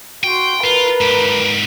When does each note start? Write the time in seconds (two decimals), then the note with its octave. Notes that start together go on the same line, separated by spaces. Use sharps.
0.24 F#4 G5 C6
0.63 F4 A#4 B4
1.01 G#2 G4